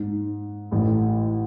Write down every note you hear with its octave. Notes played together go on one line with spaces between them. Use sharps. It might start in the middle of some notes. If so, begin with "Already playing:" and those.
Already playing: G#2
A1 A2